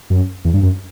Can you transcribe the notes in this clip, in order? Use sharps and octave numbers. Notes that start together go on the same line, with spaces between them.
F#2
E2
G2
F#2